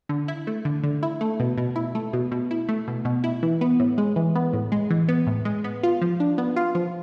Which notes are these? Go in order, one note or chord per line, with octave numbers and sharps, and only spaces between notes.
D3
E4
A3
D3
D3
E4
A3
B2
B2
E4
A3
B2
B2
E4
A3
B2
B2
E4
E3
B3
A2
G#3
E3
B3
A2
G#3
E3
B3
A2
G#3
B3
F4
F3
D4
B3
F4
F3